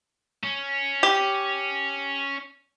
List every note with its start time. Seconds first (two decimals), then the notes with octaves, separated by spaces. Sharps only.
0.43 C#4
1.03 G4